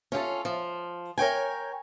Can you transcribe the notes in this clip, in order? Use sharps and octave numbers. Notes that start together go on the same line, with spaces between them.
C#4 F4 G4 A4
F3
A#4 C#5 G5 G#5